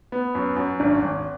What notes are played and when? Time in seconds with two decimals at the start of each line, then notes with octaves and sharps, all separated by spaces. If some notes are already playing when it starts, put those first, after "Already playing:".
0.12 B3
0.35 F#2
0.56 F#2
0.80 G#1 D4
1.02 G#1